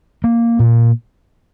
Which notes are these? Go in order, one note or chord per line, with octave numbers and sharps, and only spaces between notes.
A#3
A#2